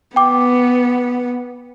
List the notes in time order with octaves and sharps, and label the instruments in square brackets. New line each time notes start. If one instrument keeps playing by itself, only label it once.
[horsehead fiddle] B3 [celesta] G5 D6